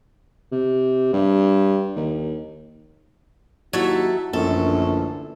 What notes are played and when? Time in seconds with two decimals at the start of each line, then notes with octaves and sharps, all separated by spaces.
0.52 C3
1.13 G2
1.96 D#2
3.73 D#2 F#3 E4 A4 E5
4.33 A#1 F#2 D3 E3 A3 A4